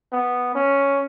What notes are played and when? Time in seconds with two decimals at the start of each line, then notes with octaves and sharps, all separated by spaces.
0.13 B3
0.55 C#4